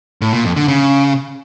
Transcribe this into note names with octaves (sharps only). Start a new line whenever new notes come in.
A2
A#2
F2
D3
C#3